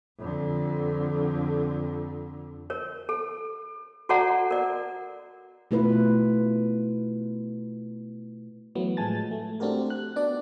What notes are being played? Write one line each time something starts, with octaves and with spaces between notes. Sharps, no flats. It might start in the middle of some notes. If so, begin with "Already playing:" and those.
F2 D3
A#4 C#5
A4
F#4 A4 C#5 D5 F#5 A#5
A#4 D5
B2 A3 E4 F4 B4
E3 F#3 A3 B3
A2 F3 G#3 G#5 A5 A6
A3
A3 C4 D4 F#4 G4 A#4
F#6
B3 D4 F#4 D5